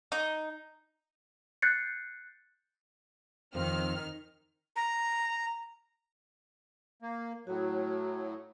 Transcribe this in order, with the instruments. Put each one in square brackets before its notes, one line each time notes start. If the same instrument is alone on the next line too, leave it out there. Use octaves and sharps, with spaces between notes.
[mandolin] D#4
[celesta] F#6 G6 A6 C7 C#7
[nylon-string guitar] F2 [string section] D#3 F6 [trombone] C4
[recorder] A#5
[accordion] A#3
[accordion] A2 F#3 [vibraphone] F#4